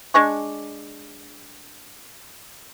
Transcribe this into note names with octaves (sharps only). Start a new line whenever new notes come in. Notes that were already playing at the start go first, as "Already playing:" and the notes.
G#3 D4 C#6